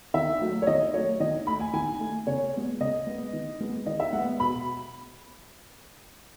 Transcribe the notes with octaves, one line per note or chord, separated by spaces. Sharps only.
D#3 E5
F#3 A3
C#5
D#3 D#5
F#3 A3 C#5
D#3 D#5
A3 B5
G#5
D#3 G#5
A3
C#3 C#5
G#3 B3
C#3 D#5
G#3 B3
D#3
G#3 B3
D#3 D#5
E5
G#3 B3 F#5
B2 B5